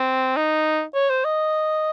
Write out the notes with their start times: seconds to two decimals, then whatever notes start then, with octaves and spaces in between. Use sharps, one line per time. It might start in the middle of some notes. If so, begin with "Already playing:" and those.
Already playing: C4
0.37 D#4
0.94 C#5
1.10 C5
1.25 D#5